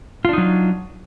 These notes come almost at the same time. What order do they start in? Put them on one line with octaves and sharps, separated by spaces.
F4 D4 D#4 F#3